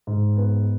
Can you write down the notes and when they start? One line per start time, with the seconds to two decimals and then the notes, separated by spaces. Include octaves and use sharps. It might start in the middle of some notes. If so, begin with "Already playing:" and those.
0.07 G#2
0.37 B3